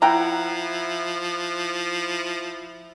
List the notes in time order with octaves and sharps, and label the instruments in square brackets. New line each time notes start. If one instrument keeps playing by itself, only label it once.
[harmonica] F3 [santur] E4 F#5 [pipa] G5 A#5